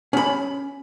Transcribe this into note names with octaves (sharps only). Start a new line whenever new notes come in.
C#4 B5